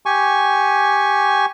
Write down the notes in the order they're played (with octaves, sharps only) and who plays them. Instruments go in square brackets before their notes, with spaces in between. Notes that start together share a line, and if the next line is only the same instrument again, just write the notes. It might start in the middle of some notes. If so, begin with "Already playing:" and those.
[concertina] G4 G#5 C#6